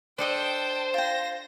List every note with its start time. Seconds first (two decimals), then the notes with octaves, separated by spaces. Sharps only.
0.19 D4 A4 C5 D#5 G5 A5
0.94 F4 G5 A#6